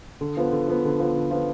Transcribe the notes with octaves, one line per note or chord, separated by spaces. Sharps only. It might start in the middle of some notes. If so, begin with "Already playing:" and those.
D3
F3 B3
D3
F3 B3
D3
F3 B3
D3
F3 B3